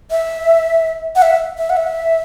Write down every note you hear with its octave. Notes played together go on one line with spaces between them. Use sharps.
E5
F#5
E5
E5
F#5
E5